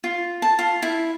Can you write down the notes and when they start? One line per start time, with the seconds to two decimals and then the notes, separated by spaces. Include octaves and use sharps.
0.04 F4
0.42 A5
0.59 F4
0.82 E4